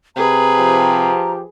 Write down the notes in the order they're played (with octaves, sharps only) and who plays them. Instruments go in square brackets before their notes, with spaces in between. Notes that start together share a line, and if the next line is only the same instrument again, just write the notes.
[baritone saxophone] C3 [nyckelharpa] G#4 B4 [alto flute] A#5
[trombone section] F3 G4